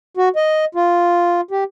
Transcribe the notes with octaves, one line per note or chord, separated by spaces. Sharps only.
F#4
D#5
F4
G4